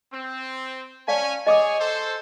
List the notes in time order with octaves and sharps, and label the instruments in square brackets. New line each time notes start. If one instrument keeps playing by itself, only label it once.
[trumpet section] C4
[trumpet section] C#4 G#5 [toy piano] D5 F5 A5
[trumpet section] G#4 C#5 G#5 [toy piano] D#5 D6 D#6
[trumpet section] A4 C5